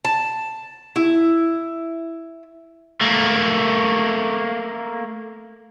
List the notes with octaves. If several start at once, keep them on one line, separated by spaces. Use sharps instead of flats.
A5
E4
A3 A#3